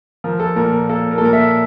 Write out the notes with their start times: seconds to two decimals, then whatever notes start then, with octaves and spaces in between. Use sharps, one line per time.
0.24 F3 A#4
0.40 A4
0.56 A#2 A#4
0.73 A#4
0.89 A#3 A4
1.11 A#4
1.18 A4
1.21 A#2 A#4
1.33 E5